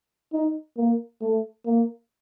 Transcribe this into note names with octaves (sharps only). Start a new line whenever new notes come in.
D#4
A#3
A3
A#3